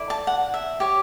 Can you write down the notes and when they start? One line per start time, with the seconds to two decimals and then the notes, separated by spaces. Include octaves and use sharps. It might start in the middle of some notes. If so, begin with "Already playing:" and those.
Already playing: E4 A4 D5
0.10 A5
0.27 F#5
0.54 E5
0.80 G4 C#5